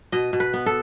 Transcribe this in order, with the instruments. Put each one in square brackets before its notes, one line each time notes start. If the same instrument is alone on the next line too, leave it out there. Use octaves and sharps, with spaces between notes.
[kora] B2 D#5
B2
B4
B3
A4